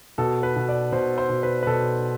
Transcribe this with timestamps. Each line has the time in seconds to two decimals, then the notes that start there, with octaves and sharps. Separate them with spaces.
0.18 B2 A4
0.43 B4
0.56 B2
0.69 D5
0.92 B2 C5
1.18 C5
1.29 B2
1.43 B4
1.63 B4
1.67 B2 A4